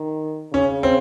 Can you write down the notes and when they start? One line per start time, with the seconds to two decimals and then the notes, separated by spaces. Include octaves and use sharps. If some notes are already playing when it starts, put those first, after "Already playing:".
Already playing: D#3
0.53 C#3 C#4
0.83 C4